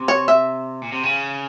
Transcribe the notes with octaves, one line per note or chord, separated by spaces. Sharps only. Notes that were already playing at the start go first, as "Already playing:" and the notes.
Already playing: C3
C#5
E5
A#2
C3
C#3